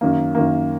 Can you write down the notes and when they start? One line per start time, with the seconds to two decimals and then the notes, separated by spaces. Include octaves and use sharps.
0.01 F#2 D#3 A#3
0.35 F#2 D#3 A#3